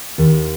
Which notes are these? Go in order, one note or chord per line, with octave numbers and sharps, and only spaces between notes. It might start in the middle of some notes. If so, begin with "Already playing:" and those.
D#2